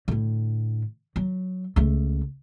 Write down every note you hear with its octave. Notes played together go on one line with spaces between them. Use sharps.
A2 D3
F#3
C#2 A3